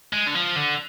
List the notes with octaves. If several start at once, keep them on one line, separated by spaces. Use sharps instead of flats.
G#3
D3
F3
D3